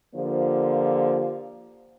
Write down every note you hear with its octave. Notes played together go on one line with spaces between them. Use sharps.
D3 F3 A#3 F4 G4 C5